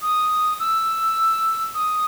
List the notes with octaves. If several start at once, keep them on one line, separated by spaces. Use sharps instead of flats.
D#6
E6
D#6